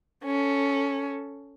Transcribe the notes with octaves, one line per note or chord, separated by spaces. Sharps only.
C#4 A4